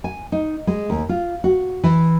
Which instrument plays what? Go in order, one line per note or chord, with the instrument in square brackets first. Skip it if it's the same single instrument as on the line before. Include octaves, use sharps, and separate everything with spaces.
[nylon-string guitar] G#5
D#4
G#3
D#2
F4
F#4
E3